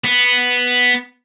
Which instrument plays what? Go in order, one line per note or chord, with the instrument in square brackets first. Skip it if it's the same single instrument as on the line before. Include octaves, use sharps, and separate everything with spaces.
[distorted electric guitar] B3